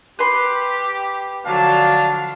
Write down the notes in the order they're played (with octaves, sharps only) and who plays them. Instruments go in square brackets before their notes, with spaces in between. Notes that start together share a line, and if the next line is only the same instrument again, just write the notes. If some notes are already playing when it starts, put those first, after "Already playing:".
[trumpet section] G4 [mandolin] B4 C6
[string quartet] D3 F3 F#3 [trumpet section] D4 F5 [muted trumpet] A5